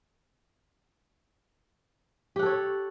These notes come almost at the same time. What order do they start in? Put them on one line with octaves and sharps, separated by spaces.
G4 F#5 A4 C#5